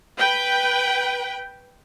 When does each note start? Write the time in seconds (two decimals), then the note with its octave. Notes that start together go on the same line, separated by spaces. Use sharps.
0.18 B4 G5